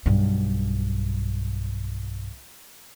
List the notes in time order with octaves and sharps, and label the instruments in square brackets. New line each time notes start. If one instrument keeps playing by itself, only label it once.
[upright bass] B1 G2